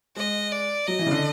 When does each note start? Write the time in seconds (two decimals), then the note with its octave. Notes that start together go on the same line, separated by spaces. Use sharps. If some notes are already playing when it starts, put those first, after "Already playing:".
0.16 G#3 D#5
0.52 D5
0.87 F#3 D#5
0.99 E3
1.06 C#3
1.11 D3